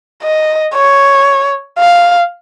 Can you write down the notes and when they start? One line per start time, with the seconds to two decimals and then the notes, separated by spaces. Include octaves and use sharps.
0.23 D#5
0.75 C#5
1.79 F5